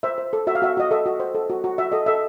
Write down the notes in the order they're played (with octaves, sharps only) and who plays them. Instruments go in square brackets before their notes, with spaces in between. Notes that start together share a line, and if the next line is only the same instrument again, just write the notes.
[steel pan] C5 E5
C5
A4
F#4 E5
F5
F#4 E5
F#4 D#5
A4 E5
F#4
C5
A4
F#4
F#4
F#4 E5
A4 D#5
A4 E5